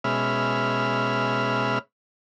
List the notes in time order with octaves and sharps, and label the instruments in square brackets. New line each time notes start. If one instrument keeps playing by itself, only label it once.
[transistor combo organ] B2 G#3 C#4 E5 B5 F6